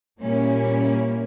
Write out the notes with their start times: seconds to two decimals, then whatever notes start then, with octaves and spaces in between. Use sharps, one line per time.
0.19 A#2 G3 A#3 C#4 E4